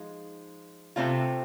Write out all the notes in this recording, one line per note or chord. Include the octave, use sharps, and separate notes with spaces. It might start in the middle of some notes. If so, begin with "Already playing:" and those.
Already playing: F3 G#3 D#4
C3 F3 A3 C4 F4